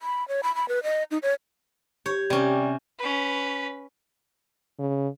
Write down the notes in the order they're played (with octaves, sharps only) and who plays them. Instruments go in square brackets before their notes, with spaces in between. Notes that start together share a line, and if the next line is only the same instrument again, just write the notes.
[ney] B5
C#5
B5
B5
B4
D#5
D#4
C#5
[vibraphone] G4 [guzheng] C#5
[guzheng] C3 C#4 [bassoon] G3
[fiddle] C#4 B4
[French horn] C#3